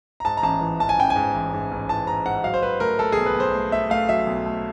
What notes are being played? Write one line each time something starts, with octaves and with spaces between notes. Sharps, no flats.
A#5
G#2 A5
A#5
A1 A5
E3
A1 A5
G#5
A1 G5
G#5
G#2
A1
G#2
A1
E3 A5
G#2 A#5
G#2 F#5
F#3 F5
C5
F#3 B4
A3 A#4
A3 A4
B1 G#4
B4
B1 C5
A3
A3 E5
A3 F5
F#3 E5
B1
A3